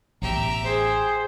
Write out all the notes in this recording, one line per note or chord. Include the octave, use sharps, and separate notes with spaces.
A1 B3 G4 E5 A#5
G#4 C5